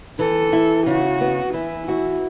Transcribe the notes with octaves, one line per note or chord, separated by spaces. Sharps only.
E3 A4
E4
C#3 F#4
B3
E3 E4
E4 F#4